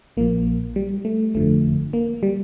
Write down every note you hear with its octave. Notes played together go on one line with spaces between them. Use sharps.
A#1 A#2 F3 A#3
G3
A3
G1 F2 D3 F3 A3
A#3
G3